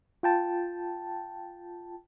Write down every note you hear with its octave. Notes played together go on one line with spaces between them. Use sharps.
F4 G5 A5